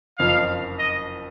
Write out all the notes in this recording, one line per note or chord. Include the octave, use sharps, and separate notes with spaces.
F#1 F2 F3 F5
D#5